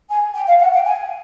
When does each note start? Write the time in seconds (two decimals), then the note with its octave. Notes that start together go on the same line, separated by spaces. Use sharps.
0.10 G#5
0.35 G5
0.48 F5
0.60 F#5
0.73 G5
0.86 G#5